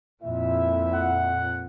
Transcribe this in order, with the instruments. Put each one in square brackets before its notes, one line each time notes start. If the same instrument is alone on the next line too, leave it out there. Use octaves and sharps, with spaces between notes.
[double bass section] F2 A#2 [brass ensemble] E4 E5
[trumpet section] F#5